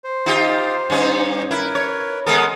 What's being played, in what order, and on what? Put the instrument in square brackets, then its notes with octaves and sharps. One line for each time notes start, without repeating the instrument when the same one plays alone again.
[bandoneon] C5
[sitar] D#4 F4 G4
G2 C#4 D#4
[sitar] E4 [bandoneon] A#4 B4
[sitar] C#5
[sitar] G#3 B3 A4 [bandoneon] A#4 D#6